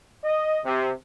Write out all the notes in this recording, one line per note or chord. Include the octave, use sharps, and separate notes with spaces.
D#5
C3